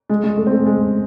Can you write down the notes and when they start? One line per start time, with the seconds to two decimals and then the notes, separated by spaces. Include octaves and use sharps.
0.09 G#3
0.24 G#3
0.37 A3
0.47 C4
0.51 A3
0.66 G#3